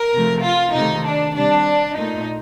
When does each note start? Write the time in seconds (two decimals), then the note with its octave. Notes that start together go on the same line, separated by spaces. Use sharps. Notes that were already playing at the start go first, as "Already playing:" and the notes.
Already playing: A#4
0.14 C3 F3 A3
0.45 F4
0.75 C3 D#3 A3 D#4
1.06 D4
1.37 C3 G3 D4
1.97 A#2 A3 D#4